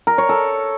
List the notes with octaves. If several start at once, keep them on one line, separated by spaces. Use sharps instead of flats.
A#4
C#5
A4